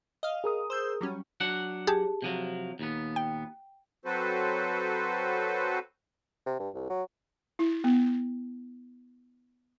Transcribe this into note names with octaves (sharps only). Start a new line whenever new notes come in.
D#5 F5
G#4 A#4 D#6
C5 E6 G6
F#3 G3 C#4
F#3 D4 F#5
G4 G#4 A5
C3 F3 F#3
D#2 A#2 B3
G5
F#3 C4 F#4 A4 B4 C5
C3
G2
C2
F#3
E4
B3